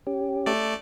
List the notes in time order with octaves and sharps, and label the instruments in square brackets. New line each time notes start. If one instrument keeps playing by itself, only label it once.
[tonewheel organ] C#4 G4
[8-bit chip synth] A3 D5